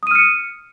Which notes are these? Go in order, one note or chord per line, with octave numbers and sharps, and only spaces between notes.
D#6 F6 C#7 D#7